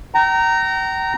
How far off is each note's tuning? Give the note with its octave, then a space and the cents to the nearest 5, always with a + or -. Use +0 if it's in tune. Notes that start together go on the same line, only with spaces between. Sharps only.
G5 -40 A#5 -10